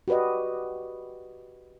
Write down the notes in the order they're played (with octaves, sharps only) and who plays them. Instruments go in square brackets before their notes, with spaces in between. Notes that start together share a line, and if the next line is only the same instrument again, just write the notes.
[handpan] F#4 G4 B4 D5 D#5